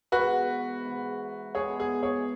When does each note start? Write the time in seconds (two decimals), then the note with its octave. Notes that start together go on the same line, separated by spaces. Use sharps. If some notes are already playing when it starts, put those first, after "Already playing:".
0.12 G#2 E3 B3 F#4 B4
0.84 G#2 E3 B3
1.55 B2 G#3 B3 G#4 C#5
1.80 G#4
2.03 G#4 C#5